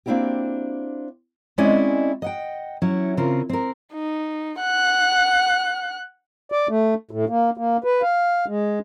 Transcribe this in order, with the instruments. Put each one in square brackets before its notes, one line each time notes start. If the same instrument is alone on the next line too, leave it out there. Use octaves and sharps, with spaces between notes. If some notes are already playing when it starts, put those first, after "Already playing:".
[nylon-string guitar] A#3 C4 D4 E4 F#4 G4
[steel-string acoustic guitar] G#3 C4 C#4 E4 D5 D#5
D#5 F#5 G5
F#3 C#4 E4
C#3 C4 F4 A#4
C4 A#4
[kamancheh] D#4
F#5 F#6
[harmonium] D5
A3
A2
A#3
A#3
B4
F5
G#3